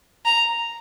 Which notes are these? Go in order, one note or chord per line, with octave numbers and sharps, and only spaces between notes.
A#5